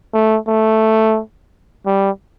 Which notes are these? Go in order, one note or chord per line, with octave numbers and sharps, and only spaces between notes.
A3
A3
G3